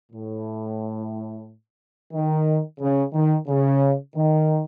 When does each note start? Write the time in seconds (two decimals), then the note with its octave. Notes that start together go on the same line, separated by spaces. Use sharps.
0.12 A2
2.13 D#3
2.80 C#3
3.13 D#3
3.47 C#3
4.15 D#3